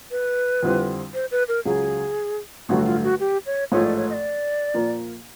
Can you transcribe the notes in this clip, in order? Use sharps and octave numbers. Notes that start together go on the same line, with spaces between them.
B4
F2 D3 G3 C4 E4
C5
B4
A#4
C#2 C#3 F#3 G#4
A1 G2 D3 F#3 A3 F#4
F4
F#4
G4
C#5
A1 G#2 F3 A3 C#5
D5
C#5
D#5
D5
A#2 F3 A#3